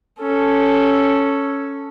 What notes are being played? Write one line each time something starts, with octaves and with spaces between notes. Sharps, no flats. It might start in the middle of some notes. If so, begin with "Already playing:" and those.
C#4 A4